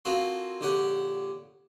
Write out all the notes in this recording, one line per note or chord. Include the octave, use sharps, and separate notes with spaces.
A#3 C4 F4 F#4 G#4 A4
A#1 D3 G4 C#5 F#5